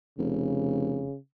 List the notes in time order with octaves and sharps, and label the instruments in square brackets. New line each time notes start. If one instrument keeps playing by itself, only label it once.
[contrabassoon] F1 [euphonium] C#3